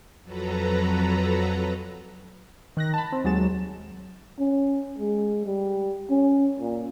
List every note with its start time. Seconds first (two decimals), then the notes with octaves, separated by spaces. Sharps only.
0.22 F2 F#3 A4 B4 A#5
2.77 D#3 F#6 A#6
2.94 A5 B5
3.12 C4
3.24 D#2 F#3 G#3 A6 E7
4.39 C#4
4.98 G#3
5.46 G3
6.10 C#4
6.60 A#2